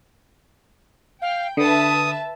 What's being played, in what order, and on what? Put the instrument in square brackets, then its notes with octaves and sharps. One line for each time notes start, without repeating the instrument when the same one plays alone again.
[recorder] F5 [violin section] G5
[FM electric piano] D3 [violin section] B4 E5 A5 [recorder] D#6